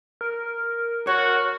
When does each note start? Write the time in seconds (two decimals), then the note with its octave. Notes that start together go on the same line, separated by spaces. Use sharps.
0.21 A#4
1.07 F#4 C#5